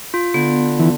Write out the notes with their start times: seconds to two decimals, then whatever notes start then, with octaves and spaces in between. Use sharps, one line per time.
0.14 F4
0.34 D3 B3
0.79 E3